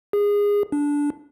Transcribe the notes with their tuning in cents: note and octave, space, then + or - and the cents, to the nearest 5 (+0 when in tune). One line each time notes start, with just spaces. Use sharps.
G#4 -20
D4 -15